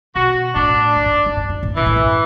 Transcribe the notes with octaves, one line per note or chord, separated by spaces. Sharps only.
B2 F#4
A2 D4
F#2
G#2
G#2
F#2
F#2
A2
B2 E3
A2
F#2